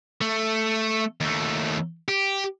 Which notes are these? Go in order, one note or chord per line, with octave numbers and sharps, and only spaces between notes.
A3
D#2 A3
G4